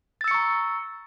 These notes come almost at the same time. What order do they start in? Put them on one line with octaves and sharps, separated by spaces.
A6 E6 C#7 C#6 A#5